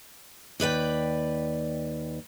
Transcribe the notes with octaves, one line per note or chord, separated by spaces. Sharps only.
D#2 B4 D5 G5